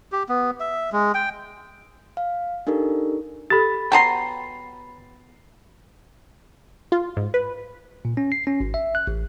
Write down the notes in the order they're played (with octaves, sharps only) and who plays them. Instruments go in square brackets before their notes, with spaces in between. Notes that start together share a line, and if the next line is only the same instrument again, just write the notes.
[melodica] G4
B3
E5
G#3
G5
[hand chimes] F5
D4 D#4 G4 A4 A#4
[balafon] G4 A4 [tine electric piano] B5 A6
[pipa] F#3 B3 C6 [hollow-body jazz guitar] G5 A5 A#5
[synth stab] F4
G#2
B4
[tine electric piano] A#2
C#4
C7
C#4
G#1
E5
F#6
A1